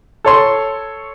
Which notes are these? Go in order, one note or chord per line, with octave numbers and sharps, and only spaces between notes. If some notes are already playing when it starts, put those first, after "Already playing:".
A4 C#5 C6